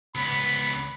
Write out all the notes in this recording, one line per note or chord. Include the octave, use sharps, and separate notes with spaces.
C#2 B3 B5